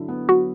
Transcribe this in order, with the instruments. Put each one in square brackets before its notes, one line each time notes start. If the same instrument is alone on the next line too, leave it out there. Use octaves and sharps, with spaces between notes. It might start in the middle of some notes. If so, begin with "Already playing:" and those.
Already playing: [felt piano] D3 F#3 E4
B3
[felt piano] F#3 [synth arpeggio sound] F#4